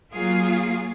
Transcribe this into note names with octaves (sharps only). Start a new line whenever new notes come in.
F#3 A#3 F4 G#4